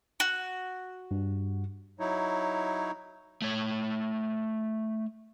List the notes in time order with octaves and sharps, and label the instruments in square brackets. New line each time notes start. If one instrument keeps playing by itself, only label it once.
[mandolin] F#4
[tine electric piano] G2
[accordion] F#3 D#4 E4 C#5
[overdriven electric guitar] A3 C#5